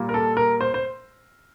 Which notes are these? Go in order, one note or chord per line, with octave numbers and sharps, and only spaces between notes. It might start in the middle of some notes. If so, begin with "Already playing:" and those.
Already playing: A#2 G3 A#3
A#4
A4
A#4
C5
C5